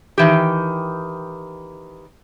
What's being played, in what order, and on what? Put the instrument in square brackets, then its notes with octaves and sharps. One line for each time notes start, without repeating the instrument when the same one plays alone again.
[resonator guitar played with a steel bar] D#3 E3 G4